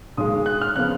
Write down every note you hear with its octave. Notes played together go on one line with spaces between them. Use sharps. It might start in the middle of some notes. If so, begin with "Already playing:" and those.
B1 A#2 G#3 D#6
F#6
F6
C#3 F3 B3 F#6